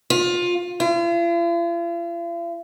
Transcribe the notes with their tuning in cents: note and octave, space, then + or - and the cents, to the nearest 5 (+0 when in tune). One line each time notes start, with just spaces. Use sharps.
F4 +20
F4 -45